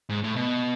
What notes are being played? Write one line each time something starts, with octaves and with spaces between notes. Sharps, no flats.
G#2
A2
B2